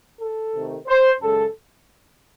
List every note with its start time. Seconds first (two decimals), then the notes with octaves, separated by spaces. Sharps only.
0.20 A4
0.54 C3 D#3 A3
0.87 C5
1.21 F#2 C#3 G#3 A4